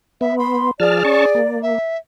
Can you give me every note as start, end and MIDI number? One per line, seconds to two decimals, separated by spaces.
0.21 0.71 59
0.21 0.38 76
0.39 0.69 83
0.39 0.68 84
0.80 1.03 53
0.80 1.39 68
0.80 1.57 74
0.80 1.03 81
0.80 1.03 89
1.04 1.26 61
1.04 1.26 81
1.04 1.26 85
1.35 1.78 58
1.62 1.97 76